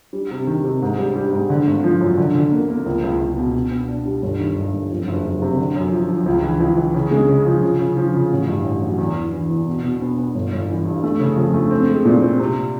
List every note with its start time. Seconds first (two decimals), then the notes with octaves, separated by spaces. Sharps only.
0.13 G3
0.31 C3
0.47 D#3
0.64 C3
0.82 G#2
0.98 G3
1.16 G3
1.32 G#2
1.50 D3
1.67 G#1
1.84 F3
2.01 F#2
2.18 D3
2.35 D3
2.52 A#3
2.68 A#3
2.86 C#2
3.03 C#2
3.19 C#2
3.37 B2
3.54 B2
3.71 B3
3.88 D4
4.06 G3
4.22 G1
4.39 D#3
4.56 G2
4.73 G1
4.91 F2
5.07 F#1
5.24 F#1
5.42 C3
5.58 D3
5.75 F#2
5.92 F3
6.09 F3
6.26 C#2
6.43 E3
6.60 C#2
6.77 E3
6.94 C#3
7.11 G#3
7.29 C#3
7.46 F3
7.62 C#3
7.79 C#3
7.97 F3
8.14 C#3
8.30 A1
8.48 G2
8.64 A1
8.82 F#3
8.98 E2
9.16 E2
9.33 E3
9.50 E2
9.67 B2
9.83 B2
10.01 B3
10.18 B3
10.35 G1
10.52 G1
10.68 E3
10.85 G2
11.03 A3
11.20 C#3
11.37 F2
11.54 A3
11.71 C4
11.89 G#3
12.05 A#2
12.21 C4
12.39 C3